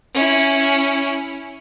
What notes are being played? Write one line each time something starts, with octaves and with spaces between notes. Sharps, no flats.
C#4 E4